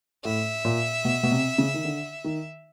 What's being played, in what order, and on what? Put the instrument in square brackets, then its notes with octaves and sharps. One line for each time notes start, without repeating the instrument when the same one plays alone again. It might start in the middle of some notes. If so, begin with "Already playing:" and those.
[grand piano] A2 [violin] E5
[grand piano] A#2
B2
B2
C3
C#3
D#3
D3
D#3